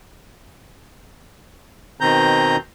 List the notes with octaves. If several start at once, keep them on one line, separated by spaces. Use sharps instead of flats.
B2 D#3 C4 A#5 G6